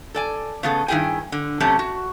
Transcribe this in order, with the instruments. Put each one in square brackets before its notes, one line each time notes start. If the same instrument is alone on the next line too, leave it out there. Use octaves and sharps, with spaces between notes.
[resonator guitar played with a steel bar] A4 D5 G#5
C#3 A3 B3 G#4 A4
G2 D#3 E4 G#4 G5 G#5
D3
F#2 C3 A3 C#4 A5
F#4